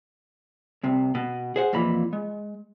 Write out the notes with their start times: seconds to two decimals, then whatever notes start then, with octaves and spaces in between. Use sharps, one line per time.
0.83 C2 C3
1.15 B2
1.56 G#4 C5 F#5
1.73 F2 A#2 E3 B5
2.13 G#3